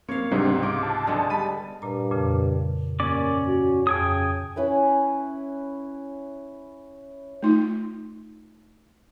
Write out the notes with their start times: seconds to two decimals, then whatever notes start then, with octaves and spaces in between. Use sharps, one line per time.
0.09 A#3 C4 C#5 F5
0.31 C#2 G#2 C3 G3 C4 D4
0.63 F4 D6
0.83 A5
1.07 D3 G#3 B3
1.30 G3 B5 D#7
1.82 G2 A#2 A#5
2.11 F2 A#2 C#3
3.00 G2 A#3 C#4 D5 D6
3.47 F#4
3.87 F2 C#3 G5 G#5 D#6
4.56 C#4 E4 B4 E5
7.43 A3 D#4 F4